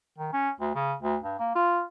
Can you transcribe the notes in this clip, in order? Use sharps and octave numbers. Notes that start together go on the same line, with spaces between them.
D#3
C#4
D2
C#3
D2
G2
A#3
F4